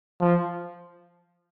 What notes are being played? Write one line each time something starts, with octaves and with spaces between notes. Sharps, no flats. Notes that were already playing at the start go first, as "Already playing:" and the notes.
F3